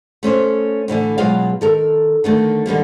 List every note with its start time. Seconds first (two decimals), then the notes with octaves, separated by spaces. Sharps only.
0.23 A3 C#4 C5 C#5
0.88 D2 A2 D3 E3
1.18 B2 F#3 G#3 B3 F4 F5
1.61 D#3 A4 A#4
2.24 D3 D#3 A3
2.66 D3 D#3 G3 A#3